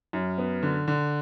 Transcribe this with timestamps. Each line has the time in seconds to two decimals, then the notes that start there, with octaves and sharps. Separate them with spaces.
0.13 F#2
0.38 B3
0.63 D3
0.88 D3